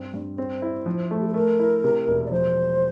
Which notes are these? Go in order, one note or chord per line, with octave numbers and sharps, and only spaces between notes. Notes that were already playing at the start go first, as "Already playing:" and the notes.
Already playing: G2 C4
G2
C4 C5
E4
F3
A3
G4
A4
A3 A#4
E4
C3
E1
D5
F3 C5